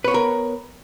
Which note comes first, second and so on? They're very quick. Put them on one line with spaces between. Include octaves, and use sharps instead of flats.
B4 C#5 B3 A#4